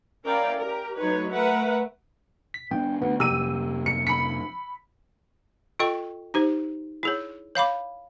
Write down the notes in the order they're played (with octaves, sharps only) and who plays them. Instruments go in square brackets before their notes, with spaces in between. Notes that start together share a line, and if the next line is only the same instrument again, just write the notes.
[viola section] C#4 E4 A#4 D5 F5 G5
G4 A#4
F#3 A3 D#4 B4 C#5
A3 A#4 B4 E5 F#5
[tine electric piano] B6
[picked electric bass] B3 C#4 D4 [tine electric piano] G5
[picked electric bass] D2 [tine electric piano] B3
[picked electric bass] F2 C3 A#3 [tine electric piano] G4 [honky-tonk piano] E6 D#7
[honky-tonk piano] C#7
[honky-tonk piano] B5 C#7 [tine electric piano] B6
[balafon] F4 A4 D#5 G5 C#6
D#4 G4 C5
E4 G#4 C#5
C#5 F5 B5 D6